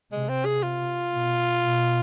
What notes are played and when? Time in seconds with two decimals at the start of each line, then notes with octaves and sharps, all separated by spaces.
0.12 C3 G#3
0.29 C4
0.45 G#4
0.63 F4
1.13 B2
1.63 B2